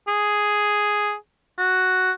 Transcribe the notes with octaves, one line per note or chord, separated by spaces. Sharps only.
G#4
F#4